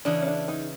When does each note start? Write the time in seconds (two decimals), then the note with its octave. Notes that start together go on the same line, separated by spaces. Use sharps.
0.05 E2 C#3 E3 D4
0.22 C#4
0.27 D4
0.48 D#4